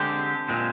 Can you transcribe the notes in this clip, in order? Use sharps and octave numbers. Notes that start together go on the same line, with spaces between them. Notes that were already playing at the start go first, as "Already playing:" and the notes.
Already playing: D3 G#3 C4 G4
A#2 G#3 C4